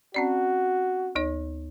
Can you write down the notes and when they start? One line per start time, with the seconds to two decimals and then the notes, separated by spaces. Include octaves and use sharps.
0.14 C4 C#4 F#4 D5
1.15 D2 D#4 C#5